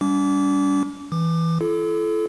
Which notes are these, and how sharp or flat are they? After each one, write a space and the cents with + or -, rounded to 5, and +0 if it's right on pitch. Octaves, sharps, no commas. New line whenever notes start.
G3 +0 C#4 +45 D6 -25
E3 -5 D6 +25
E4 +45 A4 -25